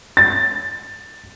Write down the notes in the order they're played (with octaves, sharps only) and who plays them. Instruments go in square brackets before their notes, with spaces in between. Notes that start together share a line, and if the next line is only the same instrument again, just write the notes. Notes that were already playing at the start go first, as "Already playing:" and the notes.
[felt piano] A6